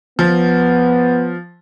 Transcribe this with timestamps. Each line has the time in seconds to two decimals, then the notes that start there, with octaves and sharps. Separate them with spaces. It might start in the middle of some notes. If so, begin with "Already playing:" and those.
0.19 F3 B3